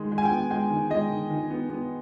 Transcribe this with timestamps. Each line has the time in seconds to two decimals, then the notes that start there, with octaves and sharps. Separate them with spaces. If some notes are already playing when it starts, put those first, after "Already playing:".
Already playing: D#3 G#3
0.12 G#3
0.18 G#5
0.25 G5
0.31 B3
0.50 G#3 G5
0.70 D#3
0.90 G#3 D#5
1.10 D#3
1.30 D#3
1.50 B3
1.70 B3